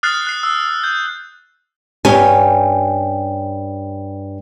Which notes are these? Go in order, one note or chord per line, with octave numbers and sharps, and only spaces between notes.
D#6 F6 F#6 A6 C7
F#6 C7
E6
G6
G2 C#4 G4 G#5